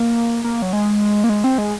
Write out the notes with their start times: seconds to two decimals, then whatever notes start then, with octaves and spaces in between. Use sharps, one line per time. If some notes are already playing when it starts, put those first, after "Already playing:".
Already playing: A#3
0.44 A#3
0.62 F#3
0.73 G#3
1.24 A#3
1.29 G#3
1.44 C4
1.58 G#3